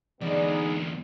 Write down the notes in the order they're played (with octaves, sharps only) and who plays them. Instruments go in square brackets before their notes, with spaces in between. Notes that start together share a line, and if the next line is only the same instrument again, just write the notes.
[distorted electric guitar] E2 D3 [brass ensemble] G#3 B3 D#4 [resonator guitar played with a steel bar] D5